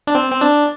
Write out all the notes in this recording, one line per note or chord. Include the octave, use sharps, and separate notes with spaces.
D4
C4
C4
D4